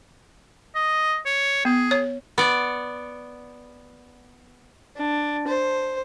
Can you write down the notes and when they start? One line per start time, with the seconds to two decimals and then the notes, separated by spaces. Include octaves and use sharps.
0.75 D#5
1.26 C#5
1.65 B3 G#4
1.91 C#5
2.38 B3 D5
4.97 D4
5.47 C5